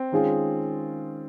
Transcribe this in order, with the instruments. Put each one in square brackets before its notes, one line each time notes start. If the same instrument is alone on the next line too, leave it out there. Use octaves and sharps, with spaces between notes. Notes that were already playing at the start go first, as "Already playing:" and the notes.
Already playing: [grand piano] C4
[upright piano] D#3 G#3 C#4 F4 G#4